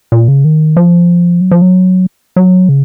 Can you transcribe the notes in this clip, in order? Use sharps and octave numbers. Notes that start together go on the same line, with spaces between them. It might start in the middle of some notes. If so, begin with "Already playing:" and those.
A#2
C#3
D#3
F3
F#3
F3
F#3
F#3
C#3